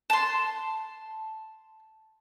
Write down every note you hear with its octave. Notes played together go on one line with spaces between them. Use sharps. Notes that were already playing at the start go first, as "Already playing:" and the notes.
A5 C6